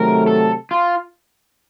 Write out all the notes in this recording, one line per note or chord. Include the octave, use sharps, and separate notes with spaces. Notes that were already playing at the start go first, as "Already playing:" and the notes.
Already playing: C3 D#3 F#3 A3 A#4
A4
F4